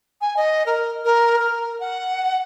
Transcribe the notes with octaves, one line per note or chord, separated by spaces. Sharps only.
G#5
D#5
A#4
A#4
A#4
F#5